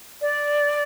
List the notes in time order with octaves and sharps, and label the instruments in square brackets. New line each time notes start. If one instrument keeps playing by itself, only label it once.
[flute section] D5